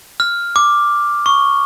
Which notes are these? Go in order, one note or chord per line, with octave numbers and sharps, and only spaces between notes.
F6
D6
C#6